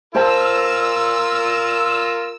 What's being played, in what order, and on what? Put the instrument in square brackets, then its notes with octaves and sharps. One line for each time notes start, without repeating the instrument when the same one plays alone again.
[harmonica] F4 A#4 [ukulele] C5 A5 [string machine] E6